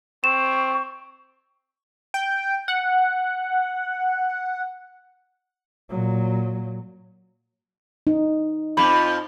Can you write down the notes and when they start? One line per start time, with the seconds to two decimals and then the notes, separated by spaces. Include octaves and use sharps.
0.24 C4 C#6 E7
2.14 G5
2.68 F#5
5.90 A#2 F#3
8.07 D#4
8.77 F2 F3 B5